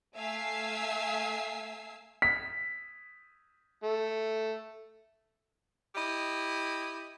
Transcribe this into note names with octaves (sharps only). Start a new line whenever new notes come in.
A3 E5 F5 G#5 E6 C7
B6
A3
E4 G4 D#5